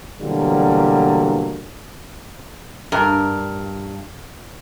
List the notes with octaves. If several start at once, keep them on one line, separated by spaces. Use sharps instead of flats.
B2 D3 E3 F#3 G3 A#3
G2 A#4